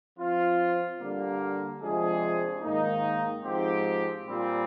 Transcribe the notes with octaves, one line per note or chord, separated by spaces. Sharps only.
F3 C4 F4
D3 G3 A#3
C3 F3 G#3 D4 G#4
G#2 D#3 A#3 D#4
G#2 F3 C4 G4
A#2 G3 C4